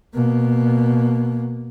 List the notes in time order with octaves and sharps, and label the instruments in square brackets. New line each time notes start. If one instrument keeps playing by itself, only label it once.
[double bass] B2 A#3